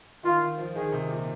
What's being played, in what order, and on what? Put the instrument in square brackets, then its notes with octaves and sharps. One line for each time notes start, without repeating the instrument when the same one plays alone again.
[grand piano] D#3 [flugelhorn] F4
[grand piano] D#3
F3
[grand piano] D#3 [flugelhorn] G#4
[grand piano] C3
A#2